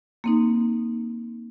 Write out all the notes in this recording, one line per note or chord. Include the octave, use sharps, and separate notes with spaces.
A#3 C4 D#4